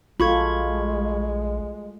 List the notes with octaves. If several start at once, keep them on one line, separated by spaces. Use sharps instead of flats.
A#1 G#3 F4 F#4 A4 B5 C#6 G#6